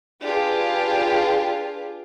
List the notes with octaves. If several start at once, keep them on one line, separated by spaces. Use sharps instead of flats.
D4 F4 G4 G#4 B4